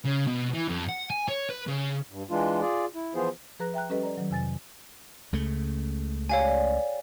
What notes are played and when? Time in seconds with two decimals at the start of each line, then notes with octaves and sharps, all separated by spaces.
0.05 C#3
0.27 B2
0.54 E3
0.68 F2
0.89 F#5
1.10 G#5
1.29 C#5
1.49 B4
1.67 C#3
2.08 G2
2.30 E3 G#3 D4 F4
2.61 F4 G#4 D5
2.95 E4
3.15 E3 F3 B3 F4 G#4 C5
3.59 F3 G#4 B4 A#5 F#6 A#6
3.74 E5 G5 A#5 F#6
3.89 G3 C#4 G4 A4 B4 D#5
4.03 D5 A#5
4.17 D#3 F#3
4.30 F2 C3 G#5 A6
5.33 C#2 C#3 A3
6.29 G4 C#5 D5 F5 G#5